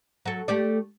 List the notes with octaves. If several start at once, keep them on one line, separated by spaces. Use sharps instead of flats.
F#3 A4
A3 G4 D5